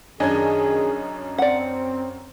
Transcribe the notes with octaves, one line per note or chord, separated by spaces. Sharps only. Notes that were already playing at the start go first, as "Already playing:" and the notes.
F#2 D#3 C#4 D4 G#4 D#5 G#5 G#6
C4 D5 F#5